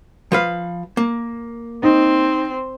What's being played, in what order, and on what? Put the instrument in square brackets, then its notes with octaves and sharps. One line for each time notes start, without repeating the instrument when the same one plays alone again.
[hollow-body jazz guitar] F3 B4 F5
A#3
[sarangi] C4 [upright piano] D#4